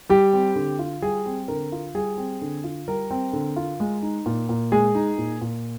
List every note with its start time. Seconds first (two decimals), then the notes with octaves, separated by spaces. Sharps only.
0.09 G3 G4
0.33 C4
0.56 D3
0.79 F4
1.02 G3 G#4
1.26 C4
1.48 D3 A#4
1.72 F4
1.95 G3 G#4
2.18 C4
2.42 D3
2.64 F4
2.88 G3 A#4
3.11 C4
3.33 D3
3.56 F4
3.80 G#3
4.03 D#4
4.26 A#2
4.49 A#2
4.72 G#3 G#4
4.95 D#4
5.18 A#2
5.41 A#2